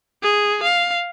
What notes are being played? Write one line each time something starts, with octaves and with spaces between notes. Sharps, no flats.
G#4
F5